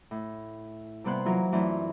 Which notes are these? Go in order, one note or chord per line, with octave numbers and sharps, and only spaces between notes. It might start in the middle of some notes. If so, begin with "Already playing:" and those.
A2
C3 G3 A#3 B3 C5 F#6
E3 F#3 F4 A#4
F#2 E3 A3 C4 D4